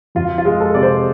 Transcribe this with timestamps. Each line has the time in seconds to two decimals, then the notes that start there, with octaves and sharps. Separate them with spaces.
0.15 F2 F4
0.38 F4
0.45 G#3
0.61 A4
0.74 C3 D5
0.83 C5